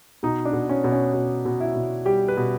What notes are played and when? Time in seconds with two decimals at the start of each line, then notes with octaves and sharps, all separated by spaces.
0.23 B2 D#4
0.45 D4
0.53 B2
0.69 C#4
0.84 B2
0.92 C#4
1.14 B2
1.45 B2
1.60 E4
1.76 B2
2.05 G3 G4
2.28 B4
2.37 B2